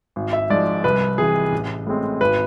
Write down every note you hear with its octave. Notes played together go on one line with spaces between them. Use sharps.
G#1
E5
G#2 F3 D5
C2 B4
C3 E3 G#4
A1
A2 G#3 C4
G#1 B4